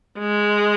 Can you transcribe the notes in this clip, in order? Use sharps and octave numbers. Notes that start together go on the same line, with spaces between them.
G#3